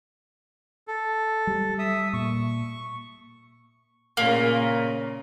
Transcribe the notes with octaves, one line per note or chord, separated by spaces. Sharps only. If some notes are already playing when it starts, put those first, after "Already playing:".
A4
G3
E5 D#6 E6
A#2 C#6
A#2 C#3 A#3